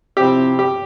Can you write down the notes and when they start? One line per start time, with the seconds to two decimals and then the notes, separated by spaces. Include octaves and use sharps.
0.16 C3 F3 C4 E4 G4
0.59 G4